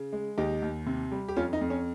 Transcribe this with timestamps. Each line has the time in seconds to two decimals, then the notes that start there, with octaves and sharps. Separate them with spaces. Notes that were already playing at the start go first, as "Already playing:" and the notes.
Already playing: C#3
0.12 G#3
0.38 D#2 D#4 G4
0.62 D#2
0.86 C3
1.12 G3
1.28 G4
1.36 F2 C#4 F4
1.53 D#4
1.61 F2
1.70 C#4